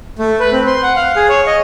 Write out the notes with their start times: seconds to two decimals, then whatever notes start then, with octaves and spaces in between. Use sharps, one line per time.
0.19 A3
0.40 B4
0.52 C4
0.67 C6
0.83 F#5
0.96 F5
1.16 G#4
1.29 C#5
1.47 D#5